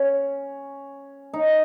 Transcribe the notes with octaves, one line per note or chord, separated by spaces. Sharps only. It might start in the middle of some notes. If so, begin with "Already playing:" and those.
Already playing: C#4
D#4